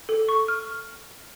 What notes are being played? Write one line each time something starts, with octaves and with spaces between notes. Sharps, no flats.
A4
C#6
F6